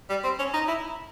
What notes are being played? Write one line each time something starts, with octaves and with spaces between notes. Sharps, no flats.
G3
C4
C#4
D#4
E4